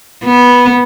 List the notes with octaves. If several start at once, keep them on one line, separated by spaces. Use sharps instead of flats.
B3